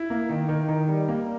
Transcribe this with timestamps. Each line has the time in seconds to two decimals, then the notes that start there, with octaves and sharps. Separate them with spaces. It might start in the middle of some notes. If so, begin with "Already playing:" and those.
Already playing: E4
0.10 A#3
0.29 D#3
0.49 D#3
0.69 D#3
0.88 G3
1.08 A#3